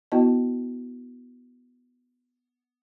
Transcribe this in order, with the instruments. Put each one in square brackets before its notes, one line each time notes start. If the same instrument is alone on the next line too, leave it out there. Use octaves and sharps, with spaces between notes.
[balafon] B3 E4 F#4 D#5 A5